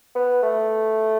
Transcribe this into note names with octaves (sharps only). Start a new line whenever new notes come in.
B3
A3